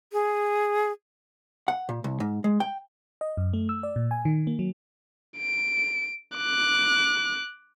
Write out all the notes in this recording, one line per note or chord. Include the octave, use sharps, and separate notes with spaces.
G#4
F#5
A#2
C2
G#2
G#3
G5
D#5
F#2
A3
E6
D5
A#2
G#5
D#3
A#3
F#3
D7
D6 F#6